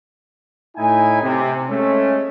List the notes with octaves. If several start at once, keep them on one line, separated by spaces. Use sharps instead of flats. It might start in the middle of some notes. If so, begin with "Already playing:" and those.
A2 D#4 E4 G#5
C3
G#3 A3 C#4